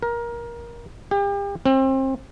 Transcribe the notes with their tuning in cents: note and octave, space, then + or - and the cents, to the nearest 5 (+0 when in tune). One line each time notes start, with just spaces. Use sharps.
A#4 +20
G4 +35
C4 +30